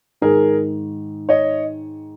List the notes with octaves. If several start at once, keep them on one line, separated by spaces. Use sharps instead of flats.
G#2 D#3 G#4 A#4
C#5 D#5